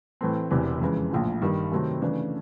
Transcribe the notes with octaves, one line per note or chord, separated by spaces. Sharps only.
A2 E3 A3 C4
E1 E2 C3 E3
F2 C#3 E3 G#3
A#1 A2 F3
G2 D#3 G3
C3 D#3 F#3 A3 C4
C#3 E3 A3 D4